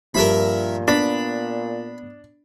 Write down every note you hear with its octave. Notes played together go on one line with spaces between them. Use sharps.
G2 A#2 F3 A#4 E5 B5
B3 D4 B5